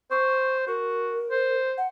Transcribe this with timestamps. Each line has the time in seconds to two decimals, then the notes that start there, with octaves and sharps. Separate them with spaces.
0.11 C5 C#6
0.68 F#4 A#4
1.31 C5
1.78 F#5